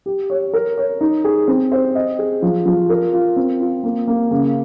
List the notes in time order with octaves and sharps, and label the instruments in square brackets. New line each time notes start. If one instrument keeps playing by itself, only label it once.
[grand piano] G4
C#5
A#4
C#5
D#4
G#4
C4
C5
D#5
G#4
F3
F3
A#4
F4
C4
F4
A#3
A#3
C#3